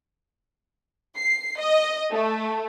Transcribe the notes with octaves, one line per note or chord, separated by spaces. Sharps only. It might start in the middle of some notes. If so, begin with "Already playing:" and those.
C7
D#5
A3